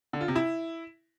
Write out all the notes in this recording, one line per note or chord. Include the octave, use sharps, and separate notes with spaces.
D3
F4
C3
E4